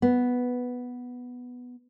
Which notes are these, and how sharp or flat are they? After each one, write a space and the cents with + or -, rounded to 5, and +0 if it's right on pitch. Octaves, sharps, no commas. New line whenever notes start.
B3 +0